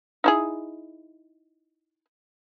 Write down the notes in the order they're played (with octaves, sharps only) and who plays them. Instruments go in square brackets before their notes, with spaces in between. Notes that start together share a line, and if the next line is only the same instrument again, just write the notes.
[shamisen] D#4 E4 G#4